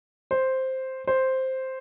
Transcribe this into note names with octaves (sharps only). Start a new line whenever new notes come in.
C5
C5